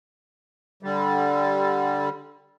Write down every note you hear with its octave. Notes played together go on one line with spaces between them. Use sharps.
D3 G3